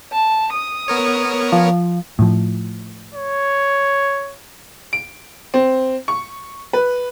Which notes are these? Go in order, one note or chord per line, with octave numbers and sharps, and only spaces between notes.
A5
D#6
B3 A#4 C#5
F3
A2 F3
C#5
D7
C4
C#6
B4